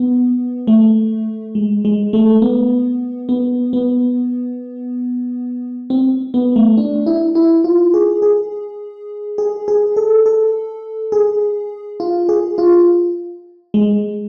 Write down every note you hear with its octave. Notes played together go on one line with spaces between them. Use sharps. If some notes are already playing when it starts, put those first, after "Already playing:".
Already playing: B3
A3
G#3
G#3
A3
B3
B3
B3
C4
B3
A3
D4
E4
E4
F4
G#4
G#4
G#4
G#4
A4
A4
G#4
F4
G#4
F4
G#3